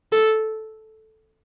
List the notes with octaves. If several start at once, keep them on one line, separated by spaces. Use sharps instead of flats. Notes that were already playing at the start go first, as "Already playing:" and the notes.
A4